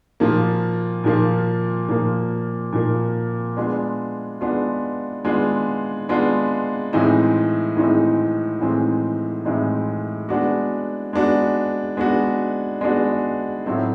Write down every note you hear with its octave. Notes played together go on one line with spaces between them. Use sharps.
A#2 F3 A#3
A#2 F3 A#3
A#2 F3 A#3
A#2 F3 A#3
G#3 B3 D4 F4
G#3 B3 D4 F4
G#3 B3 D4 F4
G#3 B3 D4 F4
A2 E3 G#3 C4 D#4
A2 E3 G#3 C4 D#4
A2 E3 G#3 C4 D#4
A2 E3 G#3 C4 D#4
G#3 B3 D4 F#4
G#3 B3 D4 F#4
G#3 B3 D4 F#4
G#3 B3 D4 F#4
A2 F#3 A3 C4